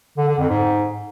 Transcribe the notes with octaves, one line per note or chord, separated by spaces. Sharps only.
D3
D3
F2
G#2